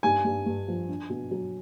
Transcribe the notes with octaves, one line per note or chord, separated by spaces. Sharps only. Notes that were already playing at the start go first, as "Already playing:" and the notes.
G2 G#5
G2
G2
F3
D4
B2
F#3